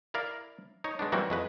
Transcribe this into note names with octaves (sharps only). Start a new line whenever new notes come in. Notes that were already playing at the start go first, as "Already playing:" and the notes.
E4 A#4 D5 F5
D#4 C#5
G#3 B3 D4
E3 F#3 G3 A#3 C4 F#4
F2 G#3 B4